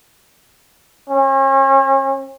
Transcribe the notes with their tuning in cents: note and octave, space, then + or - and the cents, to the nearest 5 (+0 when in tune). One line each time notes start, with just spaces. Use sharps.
C#4 -40